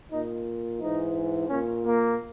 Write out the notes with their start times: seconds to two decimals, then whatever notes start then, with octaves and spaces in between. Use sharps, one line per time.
0.11 A#2 D#4
0.80 G#2 E3 D#4
1.48 A#2 C#4
1.83 A#3